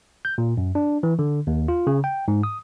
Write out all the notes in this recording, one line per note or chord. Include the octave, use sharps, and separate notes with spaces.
G6
A#2
F#2
D4
E3
D3
D#2
F4
C#3
G5
G#2
D#6